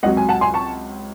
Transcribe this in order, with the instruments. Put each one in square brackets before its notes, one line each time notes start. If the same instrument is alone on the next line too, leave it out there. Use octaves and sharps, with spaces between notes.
[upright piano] C#2 C3 F#3 D#5 F#5
G#5
F#5 A5
G#5 C6
A5 C#6